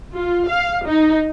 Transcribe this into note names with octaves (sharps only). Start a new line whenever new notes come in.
F4
F5
D#4